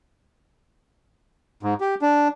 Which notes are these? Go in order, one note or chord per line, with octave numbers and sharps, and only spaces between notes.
G#2
G4
D4